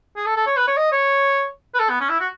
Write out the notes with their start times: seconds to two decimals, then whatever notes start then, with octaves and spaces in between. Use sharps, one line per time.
0.17 G#4
0.26 A4
0.36 A4
0.47 C#5
0.57 B4
0.68 C#5
0.77 D#5
0.92 C#5
1.75 B4
1.79 A4
1.90 B3
2.00 C#4
2.09 E4
2.20 F#4